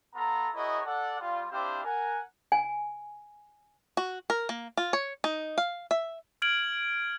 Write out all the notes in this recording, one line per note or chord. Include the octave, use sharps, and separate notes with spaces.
B3 F4 A4 A#5
E4 F#4 G#4 A#4 C#5 D#5
A4 D5 F#5
G3 F4
C4 D4 E4 G4 C5 F5
A#4 F#5 G#5
G#5
F#4
A#4
A#3
F4
C#5
D#4
F5
E5
F6 G#6 D7 F#7